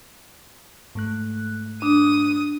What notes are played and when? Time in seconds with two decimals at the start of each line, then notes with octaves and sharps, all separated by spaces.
0.95 G#2 A3 F#6
1.82 D4 D#6